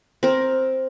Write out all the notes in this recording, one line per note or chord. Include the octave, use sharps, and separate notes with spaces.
C4 A#4